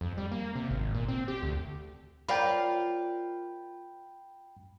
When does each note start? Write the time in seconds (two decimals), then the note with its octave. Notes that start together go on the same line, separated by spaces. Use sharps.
0.01 F2
0.18 G3
0.32 A#3
0.56 C3
0.71 G#1
0.95 A#2
1.08 C4
1.28 G4
1.43 D2
2.29 F4 A#4 D5 G5 B5